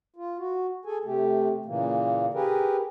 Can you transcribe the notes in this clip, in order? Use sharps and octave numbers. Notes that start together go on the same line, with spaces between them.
F4
F#4
G#4 A4 G#5
C3 A3 G4
A#2 C#3 E3 A#3
G4 G#4 A#4 B4